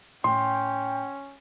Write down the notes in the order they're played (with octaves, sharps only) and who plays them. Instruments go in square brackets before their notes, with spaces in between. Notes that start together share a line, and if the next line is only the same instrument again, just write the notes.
[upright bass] A2 A3 [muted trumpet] C#4 [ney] G5 [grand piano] C6